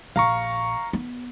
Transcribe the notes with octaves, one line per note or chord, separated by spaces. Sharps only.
A#1 F5 A#5 C#6
B3